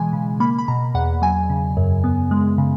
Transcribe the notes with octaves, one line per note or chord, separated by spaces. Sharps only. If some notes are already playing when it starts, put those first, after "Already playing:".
Already playing: B2 E3 G#3 G#5
C#3
A#3 B5
B5
B2 A#5
E2 F#5
F#3 G#5
C#3
F#2
B3
G#3
C#3